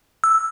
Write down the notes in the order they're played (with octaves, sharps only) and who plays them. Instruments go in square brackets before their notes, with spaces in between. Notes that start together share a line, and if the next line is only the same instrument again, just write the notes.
[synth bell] E6